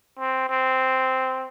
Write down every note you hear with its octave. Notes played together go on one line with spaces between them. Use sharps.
C4
C4